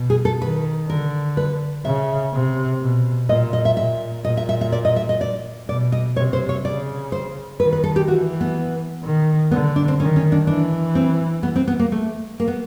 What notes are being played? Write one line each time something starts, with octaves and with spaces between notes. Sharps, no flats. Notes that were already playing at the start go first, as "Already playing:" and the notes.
Already playing: B2
G#4
A4
D#3 B4
D3 A#4
B4
C#3 E5
C3
B2
A#2 D#5
D#5
E5
A#2 E5
A#2 D#5
E5
E5
E5
D5
D#5
E5
D#5
D5
B2 D5
D#5
C3 C#5
C5
C#5
C#3 D5
C5
D#3 B4
B4
A4
G4
E3 F#4
B3
D#3
D3 B3
D4
C4
D#3 C#4
C#4
D4
E3 D4
C4
B3
C4
B3
A#3
A3
A#3
B3